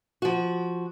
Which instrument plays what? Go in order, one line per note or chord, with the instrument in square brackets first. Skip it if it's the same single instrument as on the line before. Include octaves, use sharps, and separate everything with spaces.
[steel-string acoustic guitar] F3 F#4